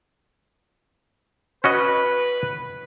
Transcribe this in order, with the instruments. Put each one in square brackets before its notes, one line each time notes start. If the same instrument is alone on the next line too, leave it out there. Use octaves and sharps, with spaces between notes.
[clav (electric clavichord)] C#4 F#4 D#5 [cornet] B4